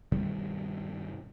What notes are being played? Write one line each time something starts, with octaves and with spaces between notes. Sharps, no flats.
G2 B2 D#3 G3